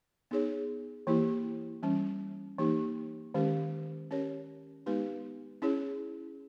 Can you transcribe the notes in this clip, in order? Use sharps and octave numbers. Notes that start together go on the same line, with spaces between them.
B3 D#4 G#4 C#5
E3 A#3 E4 G4
E3 G3 C#4
E3 A#3 D#4 G4
D#3 G#3 C#4 G4 A#4
C#4 G4 A#4 C#5
G#3 B3 D#4 G4 B4
C#4 E4 G#4 C#5